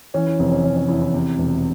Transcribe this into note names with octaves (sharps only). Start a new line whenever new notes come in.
E3 C#4
E4
F1 C4
C#4
F1 C#4
C#4
E2 E4
E4
C3
E1